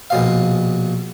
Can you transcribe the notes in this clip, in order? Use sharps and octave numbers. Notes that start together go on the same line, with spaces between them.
A#1 B2 F5